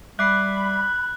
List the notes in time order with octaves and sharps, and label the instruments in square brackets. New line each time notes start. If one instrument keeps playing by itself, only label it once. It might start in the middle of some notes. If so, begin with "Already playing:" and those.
[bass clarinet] G3 [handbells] E5 D6 C7 [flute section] B5 [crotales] F#6